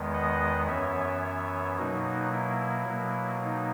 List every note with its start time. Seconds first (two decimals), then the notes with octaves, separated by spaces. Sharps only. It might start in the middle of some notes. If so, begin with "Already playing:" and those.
Already playing: E2 D#3 G#3 B3
0.13 D#5 F#5
0.67 F#2 E3 B3 C#5 E5
1.22 C#5 E5
1.77 B2 F#3 A#3 D#4 F#4
2.33 E4
2.87 B2 F#3 A#3
3.42 D#4